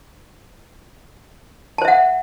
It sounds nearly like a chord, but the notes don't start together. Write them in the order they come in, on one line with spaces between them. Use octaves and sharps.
A5 C5 E5 F#5